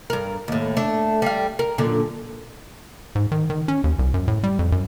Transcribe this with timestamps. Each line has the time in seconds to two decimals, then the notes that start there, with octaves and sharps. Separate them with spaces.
0.10 G2 A#4
0.48 D#2 A2
0.77 A3 D4
1.22 G3 F5
1.59 A#4
1.78 F#2 A#2 D3
3.15 G#2
3.32 D#3
3.50 D#3
3.68 C#4
3.84 D#2
3.99 C2
4.14 F#2
4.28 A2
4.44 G3
4.59 F2
4.72 F#2